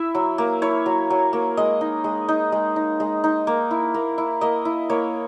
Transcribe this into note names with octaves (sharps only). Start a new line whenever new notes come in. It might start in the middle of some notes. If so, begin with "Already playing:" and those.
Already playing: E4 E5
F#3
A#3
E4 C#5
F#3
F#3
A#3
G#3 D#5
D#4
G#3
D#4
G#3
D#4
G#3
D#4
A#3
E4
A#3
E4
A#3 D#5
E4
A#3 C#5